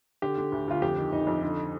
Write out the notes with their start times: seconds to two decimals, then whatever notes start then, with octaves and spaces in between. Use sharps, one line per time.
0.22 D3 G4
0.38 D3
0.52 D2
0.68 D2 F4
0.82 F2 G4
0.98 D#3
1.12 F2 D#4
1.27 F2
1.42 D3